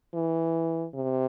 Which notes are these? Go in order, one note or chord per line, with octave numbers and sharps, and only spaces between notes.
E3
C3